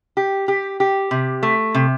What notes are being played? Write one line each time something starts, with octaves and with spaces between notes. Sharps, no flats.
G4
G4
G4
C3
A3
C3